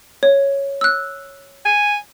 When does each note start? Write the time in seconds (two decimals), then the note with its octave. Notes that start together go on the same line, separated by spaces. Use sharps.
0.23 C#5
0.81 E6 F#6
1.65 G#5